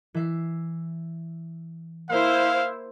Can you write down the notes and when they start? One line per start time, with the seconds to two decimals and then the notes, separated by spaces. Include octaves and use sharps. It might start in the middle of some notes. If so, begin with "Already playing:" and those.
0.14 E3 E5 C7
2.10 A#3 E4 C5 E5 F5